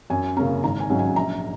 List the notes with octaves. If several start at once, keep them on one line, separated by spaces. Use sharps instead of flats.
F#2 G#5
C#3 A#3 C#4 A#5
G#1 A#5
G#5
G#2 F#3 C#4
G#5
A#1 A#5